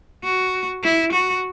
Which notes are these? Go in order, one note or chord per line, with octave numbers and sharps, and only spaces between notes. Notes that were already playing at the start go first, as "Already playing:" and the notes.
F#4
E4
F#4